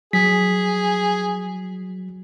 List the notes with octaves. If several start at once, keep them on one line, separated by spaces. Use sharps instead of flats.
F#3 G#4 B6